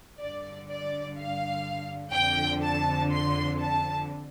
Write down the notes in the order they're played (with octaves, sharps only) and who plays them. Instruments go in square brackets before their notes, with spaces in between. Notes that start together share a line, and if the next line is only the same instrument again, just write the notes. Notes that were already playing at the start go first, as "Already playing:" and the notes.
[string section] G2 D3 D5
D5
F5
F2 D3 G5
A5
C6
A5